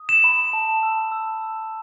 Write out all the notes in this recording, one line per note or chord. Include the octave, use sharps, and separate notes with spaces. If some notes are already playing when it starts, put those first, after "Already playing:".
Already playing: D#6
E7
B5
A5
E6
E6